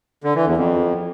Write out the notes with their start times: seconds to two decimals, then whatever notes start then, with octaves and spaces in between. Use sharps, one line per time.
0.24 D3
0.35 E3
0.46 E2
0.57 F2